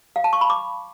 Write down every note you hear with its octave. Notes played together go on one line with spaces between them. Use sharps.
F5
A5
C#6
B5
D6